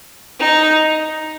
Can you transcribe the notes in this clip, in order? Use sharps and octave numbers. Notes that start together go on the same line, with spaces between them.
D#4